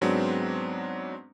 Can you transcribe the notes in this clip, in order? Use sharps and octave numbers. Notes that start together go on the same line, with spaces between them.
G#2 F#3 G#3 B3 C4 D4